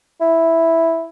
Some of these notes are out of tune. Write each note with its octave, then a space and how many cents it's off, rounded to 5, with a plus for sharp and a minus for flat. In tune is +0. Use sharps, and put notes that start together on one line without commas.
E4 -5